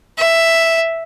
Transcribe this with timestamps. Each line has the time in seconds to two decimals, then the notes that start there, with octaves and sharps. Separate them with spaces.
0.18 E5